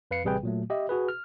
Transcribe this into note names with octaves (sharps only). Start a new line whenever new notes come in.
F2 B4 F5 C7 C#7
A1 C3 G3 G#4 B4 G5
A#2 F#3 A3
G4 D#5 E5
F#4 G#4 B4
F6